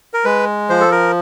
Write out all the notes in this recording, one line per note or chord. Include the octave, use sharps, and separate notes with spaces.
A#4
G#3 B4
F3 C5
A4
A#4